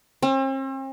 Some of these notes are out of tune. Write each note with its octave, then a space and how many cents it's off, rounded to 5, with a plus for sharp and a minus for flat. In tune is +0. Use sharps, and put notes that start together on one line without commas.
C4 +45